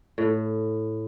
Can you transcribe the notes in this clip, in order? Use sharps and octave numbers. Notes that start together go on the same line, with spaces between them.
A2